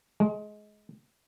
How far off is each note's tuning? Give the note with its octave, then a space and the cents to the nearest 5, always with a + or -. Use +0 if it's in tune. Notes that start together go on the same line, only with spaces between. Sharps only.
G#3 +20